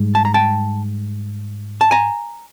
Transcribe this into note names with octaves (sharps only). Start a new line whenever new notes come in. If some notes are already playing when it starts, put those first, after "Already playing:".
Already playing: G#2 G3
A5
A#5
G5 A5
A5
G#5 A#5